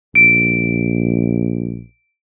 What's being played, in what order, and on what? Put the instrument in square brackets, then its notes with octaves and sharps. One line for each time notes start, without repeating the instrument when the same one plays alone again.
[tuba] A#1 [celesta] D7